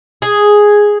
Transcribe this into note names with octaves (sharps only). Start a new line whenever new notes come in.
G#4